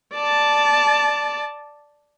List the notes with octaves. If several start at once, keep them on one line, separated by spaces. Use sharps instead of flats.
D5 A5